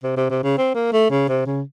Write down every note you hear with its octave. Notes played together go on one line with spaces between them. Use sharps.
C3
C3
C3
C#3
C4
A#3
A3
C#3
C3
C#3